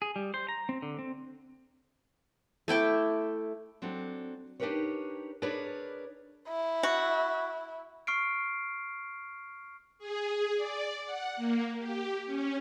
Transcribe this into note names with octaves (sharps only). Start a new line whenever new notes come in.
G#4
G3
C5
A#5
C4
D3
C4
A3 E4 G5 D6
F#3 C4 D4 A4
D4 D#4 G4 A#4 B4 C#5
D4 G#4 A#4 B4 C#5 D5
E4
F#4
C#6 F6 C7 D7
G#4
D5
F#5
A#3
G4
C#4